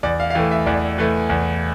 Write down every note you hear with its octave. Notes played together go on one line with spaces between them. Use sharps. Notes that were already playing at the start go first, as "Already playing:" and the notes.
E2 D5
F5
F5
E3 A3 G5
E5
E2 D5
E3 A3
E2